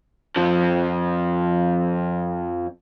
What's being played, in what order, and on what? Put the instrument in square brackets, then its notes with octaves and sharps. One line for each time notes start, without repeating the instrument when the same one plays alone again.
[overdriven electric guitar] F2 F3